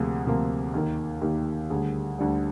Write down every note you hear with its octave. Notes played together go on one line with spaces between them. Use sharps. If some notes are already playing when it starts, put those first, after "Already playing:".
Already playing: D2 C3 F3 A#3 G#4
D2 C3 F3 A#3
D#2 D#3 A#3
D#2 D#3 A#3 G4
D2 D3 G3 G#4
D2 D3 G3